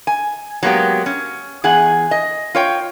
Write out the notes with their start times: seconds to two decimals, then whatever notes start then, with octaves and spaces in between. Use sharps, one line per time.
0.07 G#5
0.63 F#3 G#3 A#3 B3 G4
1.06 C#4
1.64 E2 G#4 F#5 G#5
2.11 D#5
2.55 F4 C#5 G5